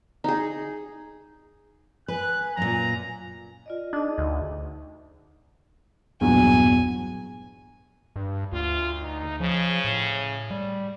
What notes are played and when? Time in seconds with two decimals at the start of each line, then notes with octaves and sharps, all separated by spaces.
0.24 D#4 G#4
2.08 B4 G#5 F#6
2.57 F#2 A#2 A#5
3.66 F4 D5 D#5
3.93 D4 D#4 G#4 D#5
4.18 D2
6.21 A1 E2 G2 A#2 F#3 G#5
8.16 G2
8.52 D2 F4
9.00 D#4
9.40 C#3 F3
9.85 A2
10.51 G3